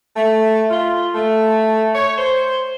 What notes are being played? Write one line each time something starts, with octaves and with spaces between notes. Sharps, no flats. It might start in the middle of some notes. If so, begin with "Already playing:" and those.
A3
F4
A3
C#5
C5